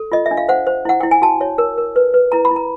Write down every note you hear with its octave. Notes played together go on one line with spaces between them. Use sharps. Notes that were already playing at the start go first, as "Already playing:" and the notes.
Already playing: A4
F4 D#5
E5
D4
F5
C5 F#5
C5
E4 F#5
E4 G5
G#5
F#4 A5
C#5
A#4
A#4
B4
B4
E4 A#5
B5
E4
A#5